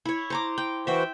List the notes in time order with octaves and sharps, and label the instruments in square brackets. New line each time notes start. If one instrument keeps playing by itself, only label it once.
[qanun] E4 C#5
C5 A#5 D6
G5
[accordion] E3 F#4 C5 [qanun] E5 G5